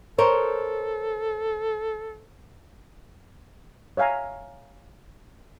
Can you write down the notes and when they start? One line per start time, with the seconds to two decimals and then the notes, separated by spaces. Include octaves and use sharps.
0.18 A4 A#4 C5 C#5
3.97 C#5 E5 F5 G#5 A#5